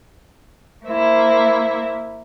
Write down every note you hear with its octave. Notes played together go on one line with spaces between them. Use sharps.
A#3 E4 C5